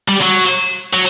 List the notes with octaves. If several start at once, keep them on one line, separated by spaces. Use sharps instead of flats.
G3
F#3
F#3